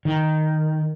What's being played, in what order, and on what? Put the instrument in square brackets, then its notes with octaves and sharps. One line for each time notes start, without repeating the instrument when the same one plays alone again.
[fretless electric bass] D#3